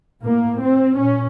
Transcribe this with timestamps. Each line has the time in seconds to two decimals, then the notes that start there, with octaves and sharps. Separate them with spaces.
0.23 A2 A#3
0.60 C4
0.97 A#2 C#4